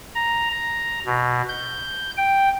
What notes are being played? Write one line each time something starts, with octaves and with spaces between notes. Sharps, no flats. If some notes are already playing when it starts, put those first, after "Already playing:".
A#5
A#5
B2
G6
G5